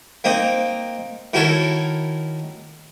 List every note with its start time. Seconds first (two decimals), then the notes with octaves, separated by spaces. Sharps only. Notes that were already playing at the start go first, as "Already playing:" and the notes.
0.24 A#3 C4 D#4
1.34 D#3 E4 F#4 A4 A#4 C#5